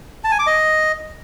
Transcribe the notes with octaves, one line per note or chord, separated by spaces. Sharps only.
A5
G#5
D6
D#5